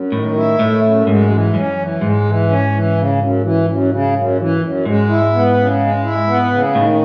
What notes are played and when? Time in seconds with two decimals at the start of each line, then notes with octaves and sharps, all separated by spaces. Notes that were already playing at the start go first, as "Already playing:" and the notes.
Already playing: F#2
0.12 A2 D#3
0.36 E4
0.59 A2 A3
0.83 F#2
1.07 G#2 G#3
1.30 E3
1.54 F#2 C#4
1.78 E3
2.01 G#2 G#3
2.25 E3
2.49 C#4
2.72 E3
2.96 C#3
3.19 F#2
3.43 E3
3.67 F#2
3.91 C#3
4.14 F#2
4.38 E3
4.62 F#2
4.85 G#2 G#3
5.09 E4
5.33 B3
5.56 C#3
5.80 G#3
6.03 E4
6.27 B3
6.51 C#3
6.75 A2 D#3